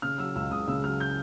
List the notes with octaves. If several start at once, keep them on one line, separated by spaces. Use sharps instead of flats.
C#3 F6
F#3 E6
C#2 E6
C#2 D#6
C#3 E6
F#3 F6
G6